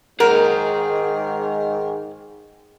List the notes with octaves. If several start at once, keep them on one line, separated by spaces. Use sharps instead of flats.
G#2 D#3 G#3 G#4 A#4 F#5